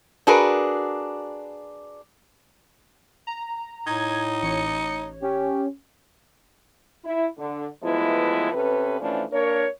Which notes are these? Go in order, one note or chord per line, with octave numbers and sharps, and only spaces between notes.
D4 F#4 G#4 A#4 B4
A#5
A2 D#4 G#6
A1 C#5 C#7
C#4 G4
E4
D3
A2 E3 F3 G#3 B3 E4
C3 C#4 A4 B4
E3 F3 A3 C#4 D4
A#3 D4 A#4 C#5